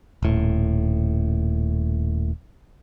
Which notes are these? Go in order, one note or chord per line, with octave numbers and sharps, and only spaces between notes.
D#1 A2